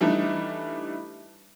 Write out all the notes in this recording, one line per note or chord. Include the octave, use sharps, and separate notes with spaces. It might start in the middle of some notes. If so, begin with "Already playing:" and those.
E3 G3 A3 D4 D#4